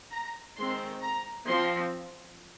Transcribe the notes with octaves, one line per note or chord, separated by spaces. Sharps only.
A#5
D#3 G#3 C4 C6
A#5
F3 C4 C6